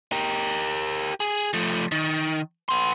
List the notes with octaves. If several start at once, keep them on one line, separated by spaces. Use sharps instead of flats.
G4 A#4
G#4
F3 A3
D#3
B3 C6